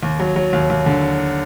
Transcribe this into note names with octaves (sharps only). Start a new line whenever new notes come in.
D#2
F#3
F#3
D#2
D#2
D3